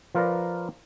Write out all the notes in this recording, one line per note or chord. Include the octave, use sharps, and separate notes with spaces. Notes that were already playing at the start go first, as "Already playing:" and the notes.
F3 F4 A#4 B4 D5 A#5